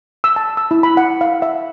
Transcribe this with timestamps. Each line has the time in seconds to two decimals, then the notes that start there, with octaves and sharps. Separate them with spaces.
0.24 E6
0.36 A5
0.57 E6
0.71 E4
0.83 B5
0.97 F#5
1.21 F5
1.42 E5